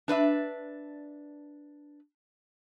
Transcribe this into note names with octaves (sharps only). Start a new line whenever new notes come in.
D4 B4 D5 E5